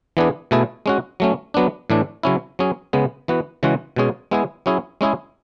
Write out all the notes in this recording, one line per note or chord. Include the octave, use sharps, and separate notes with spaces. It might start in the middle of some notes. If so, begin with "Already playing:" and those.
E3 B3 D4 G#4
B2 A3 E4 G#4
G#3 C#4 F#4
F#3 A3 C#4
F#3 B3 D4
A2 E3 A3 D4
C#3 F#3 C#4 E4
F#3 C#4 G#4
C#3 G#3 B3
E3 B3 F#4
C#3 E3 G#3 C#4 F#4
B2 G#3 C#4 G#4
G#3 B3 E4 G#4
F#3 C#4 E4 G#4
G#3 C#4 E4 G#4